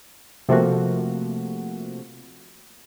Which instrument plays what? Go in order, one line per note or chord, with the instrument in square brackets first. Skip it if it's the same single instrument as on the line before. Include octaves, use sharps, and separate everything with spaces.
[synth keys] C3 F3 A3 A#3 F#4